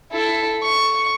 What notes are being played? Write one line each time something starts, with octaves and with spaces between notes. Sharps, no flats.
E4 A4
C#6